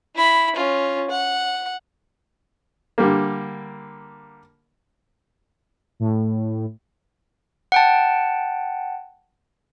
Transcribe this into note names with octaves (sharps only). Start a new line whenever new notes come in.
E4 B5
C#4 F4
F#5
D3 G3 A#3
A2
F#5 G5 A5